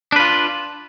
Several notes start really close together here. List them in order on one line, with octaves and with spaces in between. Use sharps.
D4 B4 F4